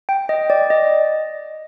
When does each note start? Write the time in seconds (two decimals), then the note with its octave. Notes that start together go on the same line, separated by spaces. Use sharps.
0.09 G5
0.29 D#5
0.50 D5
0.70 D#5